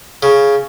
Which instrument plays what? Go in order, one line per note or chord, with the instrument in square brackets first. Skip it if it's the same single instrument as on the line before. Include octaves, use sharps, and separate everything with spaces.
[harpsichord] C#3